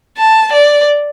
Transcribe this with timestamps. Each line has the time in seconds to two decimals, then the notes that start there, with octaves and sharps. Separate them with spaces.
0.17 A5
0.52 D5